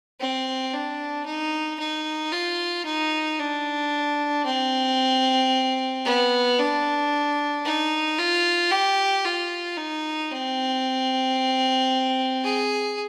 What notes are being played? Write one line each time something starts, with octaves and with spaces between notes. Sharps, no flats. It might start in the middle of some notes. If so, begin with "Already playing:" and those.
C4
D4
D#4
D#4
F4
D#4
D4
C4
B3
D4
D#4
F4
G4
F4
D#4
C4
G#4